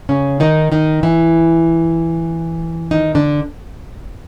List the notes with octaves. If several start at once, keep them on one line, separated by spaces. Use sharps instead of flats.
C#3 C#4
D#3 D#4
D#3 D#4
E3 E4
D#3 D#4
D3 D4